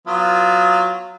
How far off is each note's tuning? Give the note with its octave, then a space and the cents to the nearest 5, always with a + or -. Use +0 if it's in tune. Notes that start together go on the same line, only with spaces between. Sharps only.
F#3 -10 B3 +0 F4 +0